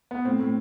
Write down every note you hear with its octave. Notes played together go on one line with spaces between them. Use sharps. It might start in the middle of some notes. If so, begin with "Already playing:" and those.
B3
A2 C4
A2